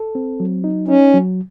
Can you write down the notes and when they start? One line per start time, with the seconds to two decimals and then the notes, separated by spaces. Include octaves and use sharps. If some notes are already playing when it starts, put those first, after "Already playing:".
Already playing: A4
0.15 C4
0.40 F#3
0.64 D#4
0.88 C#4 D#4
1.14 F#3